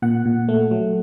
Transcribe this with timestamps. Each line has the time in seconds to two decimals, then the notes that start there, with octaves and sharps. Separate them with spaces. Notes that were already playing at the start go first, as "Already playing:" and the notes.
0.02 A#2 F#5
0.25 A#2
0.49 A3
0.71 F#3